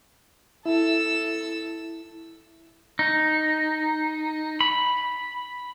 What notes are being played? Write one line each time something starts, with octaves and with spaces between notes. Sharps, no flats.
E4 A4 E6
D#4
B5